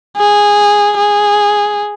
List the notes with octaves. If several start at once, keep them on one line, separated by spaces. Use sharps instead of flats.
G#4
G#4